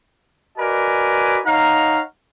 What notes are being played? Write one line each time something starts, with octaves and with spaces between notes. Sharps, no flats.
F#4 A#4 B4 D5 D#5 G#5
D#4 C#5 F5 F#5 A#5